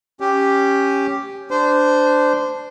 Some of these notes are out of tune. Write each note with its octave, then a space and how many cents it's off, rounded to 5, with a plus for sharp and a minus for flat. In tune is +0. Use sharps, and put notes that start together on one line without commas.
C#4 +0 G4 +0
D4 +0 C5 -20